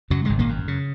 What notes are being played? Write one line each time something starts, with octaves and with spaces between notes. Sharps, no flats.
F#2 C#3 F#3
G#1 G#2 G#3
A#2 A#3
F#2
C#3